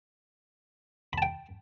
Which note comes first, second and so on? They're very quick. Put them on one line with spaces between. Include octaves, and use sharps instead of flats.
B5 A5 G5